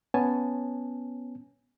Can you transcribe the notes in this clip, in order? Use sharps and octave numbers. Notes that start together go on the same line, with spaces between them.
B3 C#4 C#5 G#5 A5